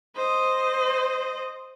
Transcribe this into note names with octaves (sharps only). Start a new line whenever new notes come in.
C5 D#5